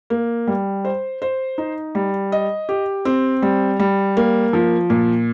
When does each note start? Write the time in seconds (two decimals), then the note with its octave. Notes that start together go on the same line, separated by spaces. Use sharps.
0.10 A#3
0.47 G3
0.85 C5
1.22 C5
1.58 D#4
1.95 G3
2.32 D#5
2.69 G4
3.05 C4
3.42 G3
3.79 G3
4.17 A#3
4.53 F3
4.90 A#2